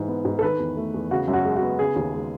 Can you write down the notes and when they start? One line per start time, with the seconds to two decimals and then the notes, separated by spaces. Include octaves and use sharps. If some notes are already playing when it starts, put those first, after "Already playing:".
Already playing: G#2 E3
0.08 B3
0.25 G#2
0.39 A4
0.43 D#3 B4
0.59 E2
0.77 A3
0.94 E2
1.11 C#3 F#4
1.28 F#2
1.33 F#4
1.45 G#3
1.56 F#4
1.62 B3
1.79 C#3 G#4
1.96 D#2
2.14 G#3